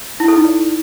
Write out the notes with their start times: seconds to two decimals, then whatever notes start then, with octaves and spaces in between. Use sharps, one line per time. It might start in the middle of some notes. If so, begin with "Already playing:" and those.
0.20 E4
0.28 A4
0.37 D#4
0.45 D5